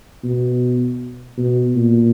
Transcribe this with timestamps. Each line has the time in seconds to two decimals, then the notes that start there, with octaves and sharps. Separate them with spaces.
0.24 B2
1.38 B2
1.75 A#2